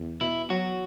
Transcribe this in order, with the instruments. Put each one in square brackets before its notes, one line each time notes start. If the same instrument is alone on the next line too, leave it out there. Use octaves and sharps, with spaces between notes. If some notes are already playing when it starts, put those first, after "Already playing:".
Already playing: [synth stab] E2
[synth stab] B2 [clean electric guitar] E4
[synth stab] F#3 [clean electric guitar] F#4